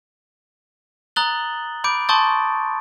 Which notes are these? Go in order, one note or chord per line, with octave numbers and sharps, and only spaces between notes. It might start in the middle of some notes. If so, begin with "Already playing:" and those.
A#5 D#6 F#6 A6 F#7 G7
B5 D6 G6 D7
A5 C6 C#6 D#6 G6 A6